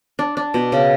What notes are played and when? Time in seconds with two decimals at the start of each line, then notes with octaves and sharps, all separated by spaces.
0.19 D4
0.37 D4
0.54 B2
0.72 C#3